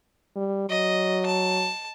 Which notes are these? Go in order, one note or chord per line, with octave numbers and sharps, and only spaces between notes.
G3
F#3 D#5
A5